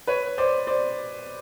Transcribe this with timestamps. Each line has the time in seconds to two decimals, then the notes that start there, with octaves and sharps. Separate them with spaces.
0.07 B4 C#5
0.38 C5 D5
0.67 C5 D5